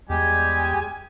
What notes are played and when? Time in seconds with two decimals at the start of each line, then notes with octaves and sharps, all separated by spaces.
0.09 E2 G3 G#3 G4 G#5